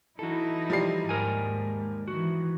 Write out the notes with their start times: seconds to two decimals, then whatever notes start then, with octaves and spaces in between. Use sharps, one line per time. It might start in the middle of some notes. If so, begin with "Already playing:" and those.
0.19 E3 D#4 E4 F#4 A4
0.70 F3 G3 C7
1.09 D#2 G#2 A#4 G#5
2.08 D#3 E3 F#4